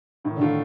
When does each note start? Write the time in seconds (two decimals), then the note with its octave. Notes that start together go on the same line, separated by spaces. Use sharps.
0.25 A2 D#3
0.36 D3
0.40 D#3 A3 D4 F4